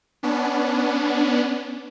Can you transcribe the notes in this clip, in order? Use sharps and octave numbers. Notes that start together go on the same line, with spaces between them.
B3 C#4 D4